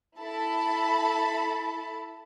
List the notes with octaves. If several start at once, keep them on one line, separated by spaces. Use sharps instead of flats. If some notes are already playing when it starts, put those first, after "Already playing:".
E4 A4 A5 B5